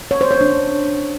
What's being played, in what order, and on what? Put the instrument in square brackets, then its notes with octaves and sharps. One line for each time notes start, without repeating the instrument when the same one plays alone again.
[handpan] C#5
C5
C#5
D4